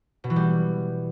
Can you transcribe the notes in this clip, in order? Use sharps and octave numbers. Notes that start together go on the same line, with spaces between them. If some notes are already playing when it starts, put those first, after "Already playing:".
B2
E3
G3